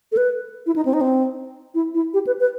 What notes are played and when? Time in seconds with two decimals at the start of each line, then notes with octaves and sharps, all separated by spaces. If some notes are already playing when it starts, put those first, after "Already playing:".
0.12 A4
0.17 B4
0.66 E4
0.76 D#4
0.85 C4
0.93 D#4
1.01 C4
1.74 E4
1.94 E4
2.14 G4
2.27 B4
2.40 B4